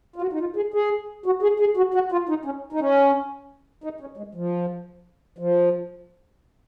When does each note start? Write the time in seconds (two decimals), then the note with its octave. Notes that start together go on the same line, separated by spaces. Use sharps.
0.16 F4
0.22 F#4
0.33 D#4
0.40 F4
0.56 G#4
0.74 G#4
1.26 F#4
1.43 G#4
1.60 G#4
1.77 F#4
1.94 F#4
2.12 F4
2.29 D#4
2.45 C#4
2.73 D#4
2.80 C#4
3.84 D#4
4.01 C#4
4.17 G#3
4.35 F3
5.38 F3